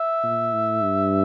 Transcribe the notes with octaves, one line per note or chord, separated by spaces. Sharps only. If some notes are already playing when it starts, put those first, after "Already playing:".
Already playing: E5
A#2
A2
G2